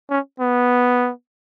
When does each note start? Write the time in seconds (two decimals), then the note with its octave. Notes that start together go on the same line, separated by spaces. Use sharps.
0.10 C#4
0.40 B3